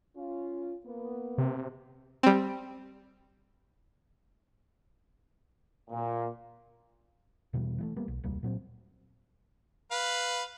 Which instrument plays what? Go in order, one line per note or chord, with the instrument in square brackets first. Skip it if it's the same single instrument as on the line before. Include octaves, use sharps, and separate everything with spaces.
[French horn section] C#4 F4
A#3 B3
[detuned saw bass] C3
[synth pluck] G3 C4
[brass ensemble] A#2
[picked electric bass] E2 B2 E3 G3
E3 G3 A3
G3 A#3 B3
B1
E1 C#2 G3 A#3
A#2 F#3 C4
[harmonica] B4 F5